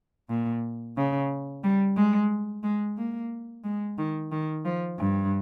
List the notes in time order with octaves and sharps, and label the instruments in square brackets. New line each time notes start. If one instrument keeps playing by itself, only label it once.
[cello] A#2
C#3
G3
G#3
G#3
A#3
G#3
D#3
D#3
F3
G2